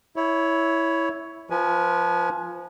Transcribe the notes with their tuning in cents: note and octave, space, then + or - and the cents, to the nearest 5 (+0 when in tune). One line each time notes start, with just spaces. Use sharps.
E4 -5 C#5 +10
F3 +0 B4 -25 G#5 +15